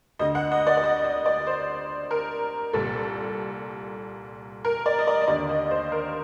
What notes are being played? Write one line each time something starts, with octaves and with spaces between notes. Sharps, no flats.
D2 D3 D#5
F#5
D#5
D5
D5
D#5
D#5
D5
C5
A#4
C2 A#2 A4
A#4
D5
D#5
D5
D#5
D#2 D3 D5
D#5
C5
A#4